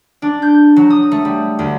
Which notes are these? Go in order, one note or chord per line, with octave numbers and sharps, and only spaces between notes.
D4
G6
F#3
D#6
A3
G3
D2